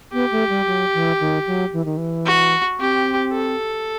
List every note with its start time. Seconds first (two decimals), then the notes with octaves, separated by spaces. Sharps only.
0.13 B3 G4
0.32 A3
0.49 G3
0.67 F#3
0.94 E3
1.20 D#3
1.47 F#3
1.73 E3
1.85 D#3
1.97 E3
2.26 F#4
2.80 C4 G4
3.33 A4